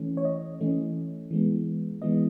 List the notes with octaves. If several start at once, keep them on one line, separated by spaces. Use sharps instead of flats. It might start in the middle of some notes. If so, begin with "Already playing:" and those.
Already playing: E3 A3 C#4
C#5
D#5
E3 A3 C#4
E3 G#3 B3
E3 G#3 B3 D#5